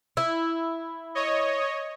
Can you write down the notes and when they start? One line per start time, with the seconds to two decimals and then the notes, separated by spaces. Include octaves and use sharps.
0.17 E4
1.15 C#5 D#5